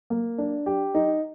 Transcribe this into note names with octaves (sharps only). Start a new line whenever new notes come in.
A#3
D4
G4
D#4